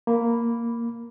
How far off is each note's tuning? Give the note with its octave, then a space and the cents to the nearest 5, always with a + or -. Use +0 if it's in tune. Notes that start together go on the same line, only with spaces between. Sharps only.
A#3 +0 B5 +0